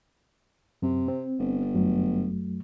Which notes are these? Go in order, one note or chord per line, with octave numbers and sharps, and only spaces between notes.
F#2 C3
C4
G1
F#2 F#3 A3